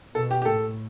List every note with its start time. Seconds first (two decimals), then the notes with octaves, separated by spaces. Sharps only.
0.15 B2 A4
0.31 G4
0.42 G4
0.45 A2 A4